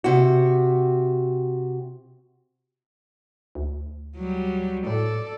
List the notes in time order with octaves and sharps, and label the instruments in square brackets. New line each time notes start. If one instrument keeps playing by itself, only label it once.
[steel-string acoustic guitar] C3 F#4
[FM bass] D2
[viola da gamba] F#3 G3
[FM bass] A2 [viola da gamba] A4 D5